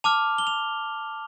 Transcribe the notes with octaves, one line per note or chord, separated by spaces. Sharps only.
A5 D6 F6 F7
G7
F7